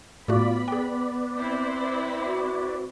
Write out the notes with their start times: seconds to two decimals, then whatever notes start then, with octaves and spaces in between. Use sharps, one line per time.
0.28 A2 A3 B3 F4 F#4 D5 B5
0.68 G#4 B4 D5 G5
1.39 C4 E4 C5
2.25 F#4